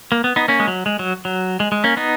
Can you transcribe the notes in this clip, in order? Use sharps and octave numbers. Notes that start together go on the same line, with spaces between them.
A#3
B3
B3 D#4
A#3 C#4
G#3
F#3
G#3
F#3
F#3
G#3
G#3
A#3 C#4
B3 D#4